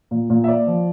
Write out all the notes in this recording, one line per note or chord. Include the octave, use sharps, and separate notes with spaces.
A#2
A#2
E5
A#3 D5
F3